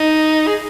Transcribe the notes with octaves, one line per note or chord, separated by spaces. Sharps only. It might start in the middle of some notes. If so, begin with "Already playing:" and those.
Already playing: D#4
G#4